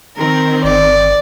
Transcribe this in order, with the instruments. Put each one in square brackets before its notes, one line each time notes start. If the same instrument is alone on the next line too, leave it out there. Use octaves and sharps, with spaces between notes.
[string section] D#3 C4 [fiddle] A#4
[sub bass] G1 [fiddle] D5